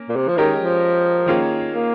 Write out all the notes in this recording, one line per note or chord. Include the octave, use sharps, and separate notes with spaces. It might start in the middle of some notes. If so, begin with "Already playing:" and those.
Already playing: A#3 C#4
A#2
C3
F3
D#3 G#3 C#4 G4 A#4 D#5
F3
D#3 A#3 C#4 F4 G#4
A#3